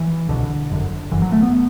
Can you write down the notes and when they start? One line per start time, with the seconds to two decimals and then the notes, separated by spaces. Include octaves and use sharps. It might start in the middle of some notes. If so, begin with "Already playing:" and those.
Already playing: E3
0.29 C2 B2 D3
0.70 G1 F#2 D3
1.11 G1 F#2 D3 E3
1.22 F#3
1.32 A3
1.42 B3